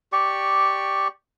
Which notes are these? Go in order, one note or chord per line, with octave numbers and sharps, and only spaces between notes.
G4 D5 C#6